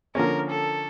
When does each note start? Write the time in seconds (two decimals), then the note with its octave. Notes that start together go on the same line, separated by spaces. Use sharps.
0.15 D3 F3 A#3 C#4 A#4
0.50 A4